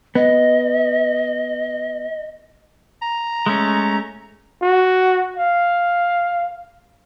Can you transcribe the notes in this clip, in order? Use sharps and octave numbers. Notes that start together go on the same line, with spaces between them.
B3 D#5
A#5
G#3 A3 C#4
F#4
F5